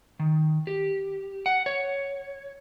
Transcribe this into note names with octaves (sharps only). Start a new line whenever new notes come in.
D#3
G4
F#5
C#5